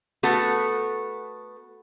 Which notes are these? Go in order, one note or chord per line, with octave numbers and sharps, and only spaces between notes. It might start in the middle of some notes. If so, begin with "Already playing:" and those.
A3 B3 F#4 A4